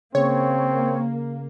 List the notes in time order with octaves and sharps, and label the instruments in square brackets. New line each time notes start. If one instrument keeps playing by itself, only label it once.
[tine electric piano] C#3 [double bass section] A#3 [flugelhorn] C4 [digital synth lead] C#5